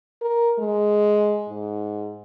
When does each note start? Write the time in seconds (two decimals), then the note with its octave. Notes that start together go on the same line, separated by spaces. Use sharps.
0.22 A#4
0.59 G#3
1.49 G#2